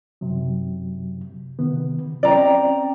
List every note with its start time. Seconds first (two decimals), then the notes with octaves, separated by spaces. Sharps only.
0.21 F#2 C3 F#3
1.59 C3 D#3 B3
2.23 C4 C#4 D5 G5 A#5